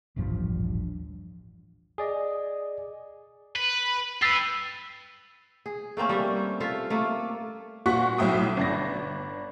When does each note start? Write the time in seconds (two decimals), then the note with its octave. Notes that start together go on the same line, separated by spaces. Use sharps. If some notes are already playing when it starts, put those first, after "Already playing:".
0.16 D#1 A1 G2 F3
1.98 G#4 D5 D#5
3.55 B4
4.22 G4 B4 E6 A6 C7
5.66 G#4
5.97 A3 A#3 C4 C#4
6.09 G3 E5
6.60 F4 A4 E5
6.90 A3 A#3
7.86 A#2 F#4 F#5 C#6 F#6 B6
8.18 B1 A2 F#3 E5 G5 D#6
8.57 G1 D4 A#6